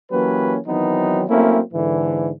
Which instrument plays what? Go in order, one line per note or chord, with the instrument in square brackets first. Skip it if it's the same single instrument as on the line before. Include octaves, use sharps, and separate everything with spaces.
[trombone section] E3 F#3 A#3 C#4 G4 B4
D#3 E3 F#3 B3 C4 D#4
F#3 A3 A#3 C4 C#4 E4
G#2 D3 E3